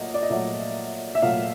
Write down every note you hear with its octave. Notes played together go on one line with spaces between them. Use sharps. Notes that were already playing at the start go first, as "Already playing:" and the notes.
Already playing: A#2 F#3 A3 D#5
D5
D#5
A#2 F#3 A3 E5
E5
A#2 F#3 A3 F5